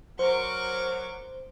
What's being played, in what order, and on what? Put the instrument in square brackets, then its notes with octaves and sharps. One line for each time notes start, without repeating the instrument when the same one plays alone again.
[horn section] F#3 A#4 [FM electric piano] C5 [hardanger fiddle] C#6 D6